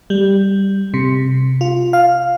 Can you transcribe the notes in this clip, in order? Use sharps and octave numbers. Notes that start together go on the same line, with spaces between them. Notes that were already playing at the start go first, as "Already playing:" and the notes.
G3
C3
F4
F5